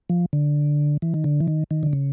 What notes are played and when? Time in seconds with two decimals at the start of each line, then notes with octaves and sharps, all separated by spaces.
0.09 F3
0.33 D3
1.02 E3
1.14 D#3
1.24 D3
1.40 E3
1.48 D#3
1.71 D#3
1.83 D3
1.93 C#3